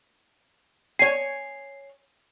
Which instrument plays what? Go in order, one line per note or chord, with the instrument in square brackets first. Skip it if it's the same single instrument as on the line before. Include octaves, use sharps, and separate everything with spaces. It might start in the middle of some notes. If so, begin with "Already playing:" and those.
[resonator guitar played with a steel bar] C#5 G#5 [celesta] C7